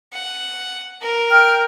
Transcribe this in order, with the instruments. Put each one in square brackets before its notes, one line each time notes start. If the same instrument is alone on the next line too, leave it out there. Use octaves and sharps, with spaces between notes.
[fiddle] F#5
A#4
[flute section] G5 F6